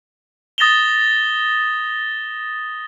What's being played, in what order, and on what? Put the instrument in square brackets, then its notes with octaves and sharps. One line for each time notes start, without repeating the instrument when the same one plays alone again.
[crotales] D#6 A6 A#6 E7 F7 G7